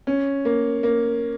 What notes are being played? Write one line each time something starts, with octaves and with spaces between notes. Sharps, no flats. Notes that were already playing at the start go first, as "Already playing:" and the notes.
C#4
A#3
A#3